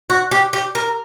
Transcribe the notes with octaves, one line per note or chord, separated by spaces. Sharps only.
F#4
G4
G4
A#4